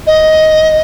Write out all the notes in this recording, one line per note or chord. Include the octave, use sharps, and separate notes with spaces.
D#5